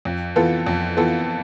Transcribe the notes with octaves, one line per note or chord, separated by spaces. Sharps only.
F2
E3 B3 F4 A4
F2
E3 B3 F4 A4